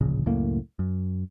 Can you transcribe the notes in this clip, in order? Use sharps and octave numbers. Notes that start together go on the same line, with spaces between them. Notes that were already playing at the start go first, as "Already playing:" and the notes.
D1 A#1 C#3
C#2 F#2 A2 A#3
F#2